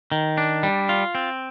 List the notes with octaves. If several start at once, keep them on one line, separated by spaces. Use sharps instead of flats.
D#3
D4
G3
F4
C4